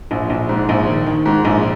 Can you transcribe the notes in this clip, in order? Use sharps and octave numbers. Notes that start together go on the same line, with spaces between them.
A#1
A#1
G#2
A#1
D#3
D#3
G#2
A#1